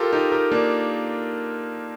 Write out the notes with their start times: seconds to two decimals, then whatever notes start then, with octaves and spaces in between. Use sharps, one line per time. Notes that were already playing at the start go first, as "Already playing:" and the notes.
Already playing: F4 G4 A4 A#4
0.13 D#4 G4
0.32 G4 A#4
0.52 A#3 D4